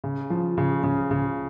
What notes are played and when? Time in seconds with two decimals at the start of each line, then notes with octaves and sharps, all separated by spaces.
0.04 C#3
0.30 F3
0.58 C#3
0.83 C#3
1.11 C#3